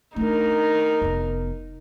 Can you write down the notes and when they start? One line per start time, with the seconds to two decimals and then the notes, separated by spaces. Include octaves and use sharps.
0.16 A3 D4 D#4 A#4
1.01 F1 B3